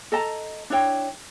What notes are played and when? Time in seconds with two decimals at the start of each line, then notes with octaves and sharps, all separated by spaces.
0.12 A4 D#5 A5 A#5
0.70 D4 E4 C#5 G5